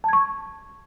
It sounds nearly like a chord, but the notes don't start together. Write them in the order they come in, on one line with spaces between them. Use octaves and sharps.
A5 G#6 C#6